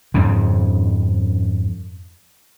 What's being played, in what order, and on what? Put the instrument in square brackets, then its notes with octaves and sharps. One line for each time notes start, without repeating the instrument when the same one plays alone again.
[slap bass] F2 G#2 C#3